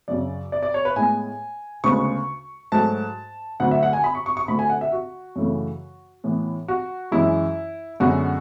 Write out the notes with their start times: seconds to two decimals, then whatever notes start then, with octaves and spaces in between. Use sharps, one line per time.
0.08 F#2 C#3 F#3 D5
0.52 D5
0.63 D5
0.74 C#5
0.85 B4
0.96 A2 G#3 B3 G#5
1.84 D2 C#3 G#3 B3 C#6
2.72 G#2 F#3 A3 A5
3.60 D2 D3 F#3 F#5
3.71 E5
3.83 F#5
3.93 G#5
4.04 B5
4.15 C#6
4.26 C#6
4.37 C#6
4.48 D2 D3 A3 B5
4.59 G#5
4.69 F#5
4.81 E5
4.92 F#4
5.36 F#2 C#3 E3 A3
6.24 A2 E3 B3
6.68 F#4
7.11 F#2 E3 G#3 E4
8.00 F#2 D3 G#3 B3 F#4